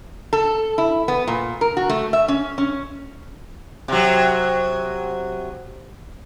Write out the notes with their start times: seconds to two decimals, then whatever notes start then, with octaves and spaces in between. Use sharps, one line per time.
0.33 A4
0.78 E4
1.08 B3
1.28 A#2
1.61 A#4
1.77 F#4
1.89 A3
2.13 E5
2.28 C#4
2.58 C#4
3.88 C3 F#3